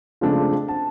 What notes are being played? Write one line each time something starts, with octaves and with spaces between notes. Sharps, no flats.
C#3 F3 G#3 A3 C4 D4
A5